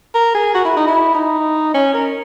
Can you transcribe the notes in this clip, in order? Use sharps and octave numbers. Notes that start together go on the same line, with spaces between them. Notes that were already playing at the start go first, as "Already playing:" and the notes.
A#4
G#4
F#4
E4
D#4
E4
D#4
C#4
A#4